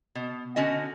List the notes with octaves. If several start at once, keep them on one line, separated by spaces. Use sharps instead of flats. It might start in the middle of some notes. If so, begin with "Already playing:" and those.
B2
D3 C#4 F#4 D#5